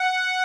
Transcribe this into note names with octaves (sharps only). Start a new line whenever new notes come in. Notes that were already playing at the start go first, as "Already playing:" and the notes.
Already playing: F#5